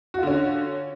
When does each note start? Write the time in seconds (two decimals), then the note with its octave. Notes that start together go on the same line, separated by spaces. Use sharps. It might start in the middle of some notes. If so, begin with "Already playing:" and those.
0.14 F#4
0.18 F4
0.23 D3
0.27 C#4